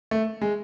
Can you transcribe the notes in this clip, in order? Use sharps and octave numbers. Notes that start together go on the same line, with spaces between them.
A3
G#3